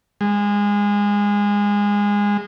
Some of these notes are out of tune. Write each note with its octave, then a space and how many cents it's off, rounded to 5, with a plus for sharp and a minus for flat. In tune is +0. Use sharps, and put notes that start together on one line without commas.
G#3 -20